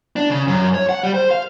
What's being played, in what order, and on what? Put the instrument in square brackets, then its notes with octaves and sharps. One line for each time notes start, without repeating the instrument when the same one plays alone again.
[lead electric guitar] D4
C#3
F#2
C#5
F#5
G3
C5
F5